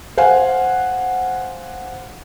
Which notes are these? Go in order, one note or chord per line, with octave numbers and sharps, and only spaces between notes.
C5 F5 F#5 G#5